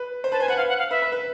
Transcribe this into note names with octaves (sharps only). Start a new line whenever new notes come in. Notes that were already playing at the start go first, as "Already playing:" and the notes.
Already playing: B4
C5
B4 A5
C5 G#5
B4 F#5
F5
F#5
F5
B4 E5
B4
B4